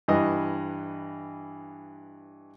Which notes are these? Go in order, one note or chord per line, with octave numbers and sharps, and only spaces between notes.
G2 E3 D#5